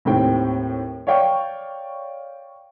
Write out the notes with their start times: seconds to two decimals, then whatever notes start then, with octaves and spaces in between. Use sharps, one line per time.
0.05 D#2 A2 C4 G5
1.07 C#5 D5 F5 G5 C#6